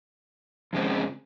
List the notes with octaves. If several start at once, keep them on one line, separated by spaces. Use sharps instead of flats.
F2 C#3 G#3 C4